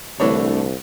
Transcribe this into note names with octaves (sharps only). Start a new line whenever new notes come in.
C2 D3 E3 A3 D4 C#5